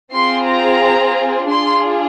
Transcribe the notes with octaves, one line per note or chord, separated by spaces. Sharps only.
C4 F4 G#4 C6
A#5
D4 F4 G#4 C6